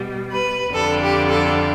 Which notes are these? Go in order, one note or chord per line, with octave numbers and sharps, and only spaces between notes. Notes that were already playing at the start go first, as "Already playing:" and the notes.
Already playing: B2 G3
B4
F2 D3 G3 A4
G4
A4